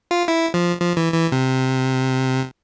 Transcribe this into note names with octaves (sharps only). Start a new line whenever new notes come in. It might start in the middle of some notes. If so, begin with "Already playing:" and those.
F4
E4
F3
F3
E3
E3
C3